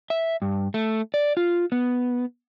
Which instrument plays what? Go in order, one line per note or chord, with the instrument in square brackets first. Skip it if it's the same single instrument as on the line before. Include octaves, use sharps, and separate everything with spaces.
[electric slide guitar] E5
G2
A3
D5
F4
B3